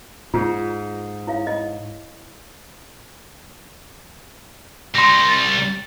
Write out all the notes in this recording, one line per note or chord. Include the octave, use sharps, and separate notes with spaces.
G#2 F4
E4 C#5 F5
D#5
C2 G3 C6 A#6
A6